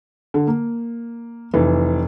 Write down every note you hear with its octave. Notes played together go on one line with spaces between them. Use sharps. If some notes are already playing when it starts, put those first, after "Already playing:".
D3
A#3
F1 E3